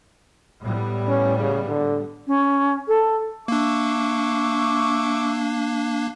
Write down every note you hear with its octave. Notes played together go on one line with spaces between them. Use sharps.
A2 G3 B3
C#4
C#3
D3
C#4
A4
A#3 D4 E5 C#6 D6